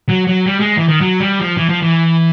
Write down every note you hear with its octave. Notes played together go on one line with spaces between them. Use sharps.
F#3
F#3
G3
G#3
E3
D#3
F#3
G3
F3
E3
F3
E3